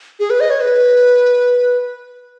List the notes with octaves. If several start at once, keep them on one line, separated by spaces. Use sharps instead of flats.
G#4
B4
D#5
C#5
B4